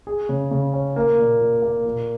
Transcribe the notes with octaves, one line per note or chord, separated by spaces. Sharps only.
G#4
C#3
C#3
C#4
A#3
A#2
A#2
A#3
A#2